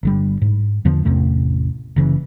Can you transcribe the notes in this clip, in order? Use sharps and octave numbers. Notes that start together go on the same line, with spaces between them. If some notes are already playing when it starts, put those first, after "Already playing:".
G1 D3 G3
G#2
E2 D3 F3 B3
A1 E2 C3 A3
F#1 C#3 E3